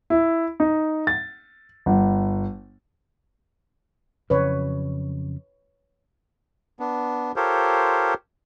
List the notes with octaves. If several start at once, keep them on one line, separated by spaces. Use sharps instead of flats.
E4
D#4
A6
G1
F2 C#3 F#3 B4 C#5
B3 D4
F4 G4 A4 A#4 C5 C#5